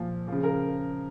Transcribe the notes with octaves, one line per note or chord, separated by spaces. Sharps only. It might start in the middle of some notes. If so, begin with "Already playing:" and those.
Already playing: A#2 F3
C#3 F3
A#4